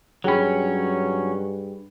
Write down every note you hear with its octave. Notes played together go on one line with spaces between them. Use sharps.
G2 F#3 C#4 G#4 G5 B5